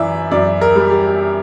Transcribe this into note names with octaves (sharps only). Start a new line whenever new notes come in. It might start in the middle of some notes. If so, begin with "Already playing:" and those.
Already playing: F#2 E3 D5 E5
F#2 D5
A#4
G3
G4